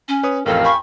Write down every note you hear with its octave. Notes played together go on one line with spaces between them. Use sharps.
C#4
B4 C#5 D#6
A1 F2 G4 A4 A#4 F5
G5 G#5 B5 C#6